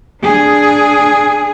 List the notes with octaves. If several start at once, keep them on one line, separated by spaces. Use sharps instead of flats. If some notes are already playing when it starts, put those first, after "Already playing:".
D4 G#4